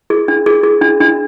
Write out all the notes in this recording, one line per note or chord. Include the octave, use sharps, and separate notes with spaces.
G#4
D4
G#4
G#4
D4
D4